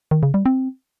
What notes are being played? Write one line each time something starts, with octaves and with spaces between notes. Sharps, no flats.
D#3
C#3
G3
C4